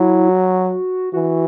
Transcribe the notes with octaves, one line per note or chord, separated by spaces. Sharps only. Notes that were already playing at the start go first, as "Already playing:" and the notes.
Already playing: F#3 E4
F#4
E3 F#4